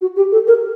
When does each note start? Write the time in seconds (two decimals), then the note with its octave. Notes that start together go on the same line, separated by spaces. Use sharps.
0.01 F#4
0.16 G4
0.32 A4
0.47 A#4